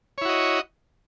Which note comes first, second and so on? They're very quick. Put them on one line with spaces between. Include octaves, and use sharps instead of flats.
C#5 E4 F#4 D#5